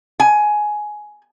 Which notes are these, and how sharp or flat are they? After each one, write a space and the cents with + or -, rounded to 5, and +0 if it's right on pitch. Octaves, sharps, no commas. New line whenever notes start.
G#5 +15